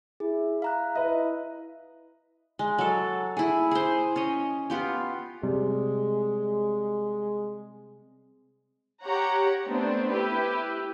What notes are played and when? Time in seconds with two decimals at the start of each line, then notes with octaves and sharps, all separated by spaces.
0.20 E4 G#4
0.62 F5 A#5 F#6
0.96 B4 D#5 E5
2.59 G#3
2.78 F#3 A4
3.37 E4 G#4
3.71 G#4 C5
4.16 C#4 C#5 D#5
4.70 B3 F4 G4
5.43 C3 G3 G#3
9.02 G4 C#5 F#5 A#5
9.66 A3 B3 C4 D4
10.11 E4 G4 B4